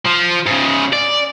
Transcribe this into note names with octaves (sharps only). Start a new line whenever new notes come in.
F3
G#2 C#3
D5